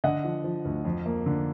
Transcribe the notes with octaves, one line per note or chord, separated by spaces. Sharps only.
D3 D#5 F#5
F3
F3
D2
F2
A#3
D3